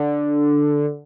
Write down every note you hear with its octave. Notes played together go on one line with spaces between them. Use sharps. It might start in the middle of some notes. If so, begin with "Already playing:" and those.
Already playing: D3